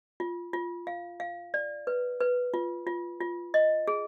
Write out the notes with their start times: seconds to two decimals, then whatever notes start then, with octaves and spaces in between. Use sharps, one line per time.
0.20 F4
0.53 F4
0.87 F5
1.20 F5
1.54 D5
1.87 B4
2.20 B4
2.54 F4
2.87 F4
3.21 F4
3.54 D#5
3.88 G#4